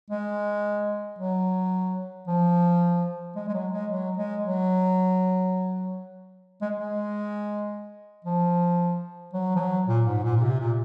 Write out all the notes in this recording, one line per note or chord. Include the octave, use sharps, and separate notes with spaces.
G#3
F#3
F3
G#3
G#3
F#3
G#3
F#3
G#3
F#3
G#3
G#3
F3
F#3
F3
F#3
A#2
G#2
A#2
A#2
C3
A#2